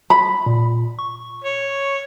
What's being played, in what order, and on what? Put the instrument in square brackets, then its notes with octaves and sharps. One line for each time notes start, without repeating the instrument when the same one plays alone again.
[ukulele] B5
[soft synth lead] A#2
C#6
[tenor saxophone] C#5